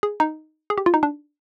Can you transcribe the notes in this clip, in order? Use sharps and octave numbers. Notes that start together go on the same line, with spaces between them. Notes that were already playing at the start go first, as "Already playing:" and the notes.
G#4
D#4
G#4
G4
F4
D#4
D4